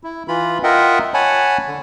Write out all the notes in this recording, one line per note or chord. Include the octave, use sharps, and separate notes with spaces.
E4
E3 F4 B5
F4 A#4 D#5 E5 F#5 G5
C#5 F#5 G#5 A5 B5
D3